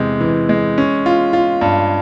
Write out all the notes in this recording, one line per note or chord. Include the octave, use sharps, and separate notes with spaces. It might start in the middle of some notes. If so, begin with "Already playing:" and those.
Already playing: E2 C3 E3 G#3
E3
G#3
C#4
F4
F4
G2